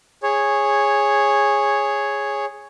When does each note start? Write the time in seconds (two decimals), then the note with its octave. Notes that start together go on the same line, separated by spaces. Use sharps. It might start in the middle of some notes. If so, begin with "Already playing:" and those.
0.23 G#4 C#5